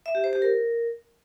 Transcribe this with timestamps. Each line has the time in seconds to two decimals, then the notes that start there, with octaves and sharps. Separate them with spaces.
0.06 E5
0.15 G4
0.24 C5
0.33 G4
0.42 A#4